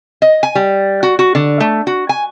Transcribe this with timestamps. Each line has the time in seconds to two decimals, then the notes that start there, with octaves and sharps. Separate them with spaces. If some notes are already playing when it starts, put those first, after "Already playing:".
0.22 D#5
0.43 G#5
0.55 G3
1.03 F#4
1.19 F#4
1.35 D3
1.60 A3
1.87 F#4
2.09 G#5